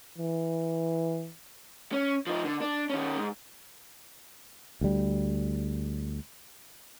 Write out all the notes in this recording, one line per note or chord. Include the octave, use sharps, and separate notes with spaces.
E3
C#4
F3 D#4
D3
D4
D#3 C#4
G#2
D2 G3